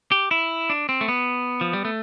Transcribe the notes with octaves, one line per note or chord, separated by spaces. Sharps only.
G4
E4
D4
C4
A3
B3
F3
G3
A3